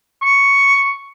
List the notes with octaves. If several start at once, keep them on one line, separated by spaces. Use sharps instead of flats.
C#6